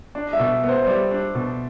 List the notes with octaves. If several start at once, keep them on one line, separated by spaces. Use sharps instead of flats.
D4
E5
B2
B3
C5
C5
G3 D5
D4
B2